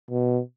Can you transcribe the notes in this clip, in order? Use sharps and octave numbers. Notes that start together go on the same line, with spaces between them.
B2